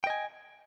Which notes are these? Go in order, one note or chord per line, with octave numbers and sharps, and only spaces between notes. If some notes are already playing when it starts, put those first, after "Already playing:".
D#5 G5 G#5